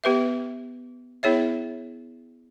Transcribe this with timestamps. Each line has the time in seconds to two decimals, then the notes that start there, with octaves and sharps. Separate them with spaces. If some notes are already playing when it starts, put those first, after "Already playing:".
0.04 B3 G4 B4 E5
1.23 B3 E4 G#4 C#5 E5